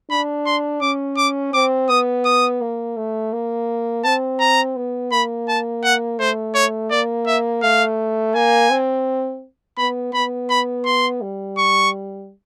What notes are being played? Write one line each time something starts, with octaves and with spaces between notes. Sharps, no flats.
D4 B5
C6
C#4 D6
D6
C4 D6
B3 D#6
D#6
A#3
A3
A#3
C4 A5
A#5
B3
A#3 B5
A5
F#5
A3 C5
C#5
A#3 D5
E5
A3 F5
A#3 G#5
C4
B3 B5
B3 B5
B5
C6
G3
C#6